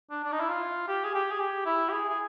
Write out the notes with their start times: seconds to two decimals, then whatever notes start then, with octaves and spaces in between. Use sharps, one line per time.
0.10 D4
0.24 D4
0.32 D#4
0.41 E4
0.49 F4
0.88 G4
1.05 G#4
1.15 G4
1.32 G#4
1.40 G4
1.66 E4
1.89 G4
1.93 G#4
2.09 G#4